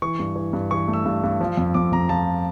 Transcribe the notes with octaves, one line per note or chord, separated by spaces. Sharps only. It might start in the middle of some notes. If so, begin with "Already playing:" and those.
E3 C#6
G2
E3
G2
E3 C#6
A3
E6
G2
G2
F3
F2
F2 D6
F2 A#5
F3 A5